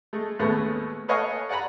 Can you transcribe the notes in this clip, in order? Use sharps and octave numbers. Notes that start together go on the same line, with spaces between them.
G#3 A3
D#2 A2 G#3 A3 B3 C#4
A4 B4 C#5 D#5 F5 G#5
D5 F#5 G#5 A#5 B5